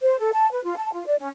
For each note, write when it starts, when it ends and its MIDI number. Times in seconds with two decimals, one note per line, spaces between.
0.01 0.19 72
0.19 0.30 69
0.33 0.47 81
0.51 0.62 71
0.64 0.75 65
0.77 0.90 81
0.93 1.06 65
1.07 1.15 74
1.19 1.28 61